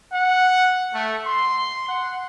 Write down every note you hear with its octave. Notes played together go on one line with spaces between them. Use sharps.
F#5
A3
C6
F#5